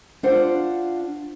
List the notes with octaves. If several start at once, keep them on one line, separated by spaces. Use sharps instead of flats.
D4 F4 C5 F#5